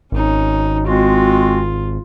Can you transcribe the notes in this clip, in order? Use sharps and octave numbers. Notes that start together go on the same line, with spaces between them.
G#1 C#4 D#4
G#3 C4 F4 F#4